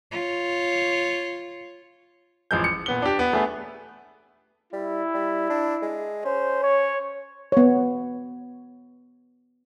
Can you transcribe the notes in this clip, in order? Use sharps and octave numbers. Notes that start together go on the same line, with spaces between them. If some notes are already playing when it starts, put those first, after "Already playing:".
F4 C#5
A1 F3 G#3 G6
C#7
A#2 B3 G7
D4 G4
B3
A3 B3 G#4 B4
G3 E4
G3
D4
G#3
C#4 C5
C#5
B3 C#5